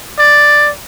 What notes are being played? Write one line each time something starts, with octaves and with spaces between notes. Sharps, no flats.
D5